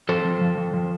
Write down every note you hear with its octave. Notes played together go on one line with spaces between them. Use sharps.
F3 A4 C5
F3
F3
F3
F3